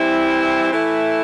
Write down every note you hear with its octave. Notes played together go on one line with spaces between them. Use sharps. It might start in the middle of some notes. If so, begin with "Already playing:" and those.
Already playing: E3 G3 C4 E4
E3 A3 E4